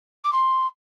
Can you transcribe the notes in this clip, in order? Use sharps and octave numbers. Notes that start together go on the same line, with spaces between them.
D6
C6